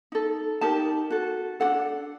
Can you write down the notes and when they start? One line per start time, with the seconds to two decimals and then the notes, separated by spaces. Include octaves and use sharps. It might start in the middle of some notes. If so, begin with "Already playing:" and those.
0.12 D#4 A4
0.61 D#4 G4 A#4 A5
1.10 F#4 A4
1.60 D4 F#4 A4 F#5